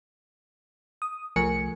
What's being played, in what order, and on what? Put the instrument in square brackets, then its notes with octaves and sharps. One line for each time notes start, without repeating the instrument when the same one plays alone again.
[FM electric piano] D#6
C2 F3 A3 A#4 G#5 C#7